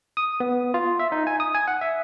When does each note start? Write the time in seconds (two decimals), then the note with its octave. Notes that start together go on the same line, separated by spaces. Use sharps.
0.17 D#6
0.40 B3
0.74 F4
0.99 E5
1.12 D#4
1.27 G#5
1.40 D#6
1.55 G#5
1.67 F#5
1.81 E5